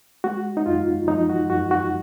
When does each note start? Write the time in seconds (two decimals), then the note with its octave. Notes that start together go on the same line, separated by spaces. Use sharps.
0.24 G#3 F#4
0.57 D#4
0.66 F#2 F4
1.08 F3 D#4
1.29 F#4
1.50 F#2 F#4
1.71 F#4